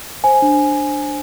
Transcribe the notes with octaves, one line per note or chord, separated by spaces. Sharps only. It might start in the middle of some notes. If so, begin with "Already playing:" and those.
C5 G#5
D4